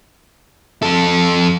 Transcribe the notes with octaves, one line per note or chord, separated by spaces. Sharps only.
F2 A4